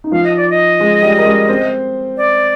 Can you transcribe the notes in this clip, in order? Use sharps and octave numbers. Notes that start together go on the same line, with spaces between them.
D#4
F3 F4 F5
D#5
D5
D#5
G#3 G#4
G3 G4
A#4
G#3 G#4
C4 C5
D5